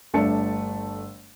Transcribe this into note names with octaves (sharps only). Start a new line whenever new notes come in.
G1 A3 D4 A5 C#7